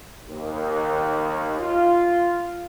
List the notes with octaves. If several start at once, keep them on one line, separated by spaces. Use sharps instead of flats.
D#2
F4